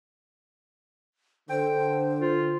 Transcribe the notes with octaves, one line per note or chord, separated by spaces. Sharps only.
D3 C5 G5
F4